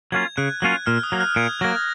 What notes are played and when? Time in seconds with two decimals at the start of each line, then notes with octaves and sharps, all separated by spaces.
0.12 F#3 A#3 C#4 F4 G#6
0.37 C#3 F#6
0.62 F#3 A#3 C#4 F4 F#6
0.86 A#2 F6
1.03 D#6
1.12 F#3 A#3
1.20 F#6
1.36 A#2 G#6
1.61 F#3 A#3 A#6